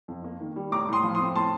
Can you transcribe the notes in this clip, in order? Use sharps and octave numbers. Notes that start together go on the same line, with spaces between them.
F2
A#3
D#3
G3
A2 A#5 D6
A2 C6 D#6
F3
C6 D#6
C4
A2 A5 C6